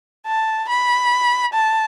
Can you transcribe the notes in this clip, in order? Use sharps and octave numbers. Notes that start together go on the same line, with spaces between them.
A5
B5
A5